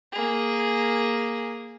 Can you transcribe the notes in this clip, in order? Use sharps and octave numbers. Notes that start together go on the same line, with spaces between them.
A#3 G#4